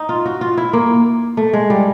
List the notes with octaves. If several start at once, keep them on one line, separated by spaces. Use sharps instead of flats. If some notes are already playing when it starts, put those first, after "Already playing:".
Already playing: D#4
F4
F#4
F4
E4
A#3
A3
G#3
G3